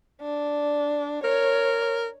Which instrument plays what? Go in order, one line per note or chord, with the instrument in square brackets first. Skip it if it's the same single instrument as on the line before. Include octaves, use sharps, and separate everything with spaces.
[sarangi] D4
[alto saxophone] A#4 [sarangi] C#5